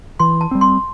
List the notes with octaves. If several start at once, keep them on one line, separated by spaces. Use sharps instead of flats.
E3 C6
A5
G3 C4
C6